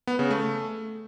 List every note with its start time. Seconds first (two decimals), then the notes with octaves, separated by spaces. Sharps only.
0.07 B3
0.19 C#3
0.30 A3